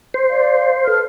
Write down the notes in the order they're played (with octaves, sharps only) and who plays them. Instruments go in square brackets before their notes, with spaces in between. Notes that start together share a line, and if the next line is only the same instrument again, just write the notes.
[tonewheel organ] C5
[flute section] D5 F5
A4 B4 F6